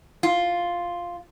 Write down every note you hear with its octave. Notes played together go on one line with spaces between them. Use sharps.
F4